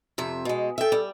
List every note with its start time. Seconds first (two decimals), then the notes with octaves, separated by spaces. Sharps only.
0.18 F2 C3 E5
0.45 B2 G#3
0.78 A4 E5 G5
0.92 G3